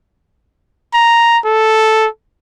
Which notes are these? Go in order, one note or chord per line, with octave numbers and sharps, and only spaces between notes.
A#5
A4